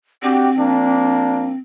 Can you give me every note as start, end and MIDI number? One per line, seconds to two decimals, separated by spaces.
0.23 1.57 60
0.23 0.50 62
0.23 0.50 66
0.23 0.50 67
0.58 1.55 53
0.58 1.55 58
0.58 1.55 62